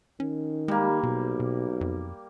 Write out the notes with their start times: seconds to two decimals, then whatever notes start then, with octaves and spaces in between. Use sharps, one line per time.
0.20 D#3 C#4
0.68 G3 G#3 A#3
1.03 B1 B2
1.40 B2
1.81 F2